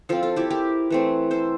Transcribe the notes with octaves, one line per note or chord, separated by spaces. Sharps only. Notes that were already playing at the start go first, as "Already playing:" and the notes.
F3 C4 F4 A4
F4 A4
E4 G4
G4 A#4
E3 A3 C4
A4 C5